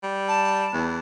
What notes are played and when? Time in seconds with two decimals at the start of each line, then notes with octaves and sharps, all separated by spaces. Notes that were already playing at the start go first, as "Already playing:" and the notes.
0.03 G3
0.28 A5
0.74 E2